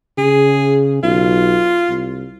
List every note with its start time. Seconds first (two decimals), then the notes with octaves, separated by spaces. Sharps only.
0.18 C#3 G#4
1.03 B1 F4
1.89 C2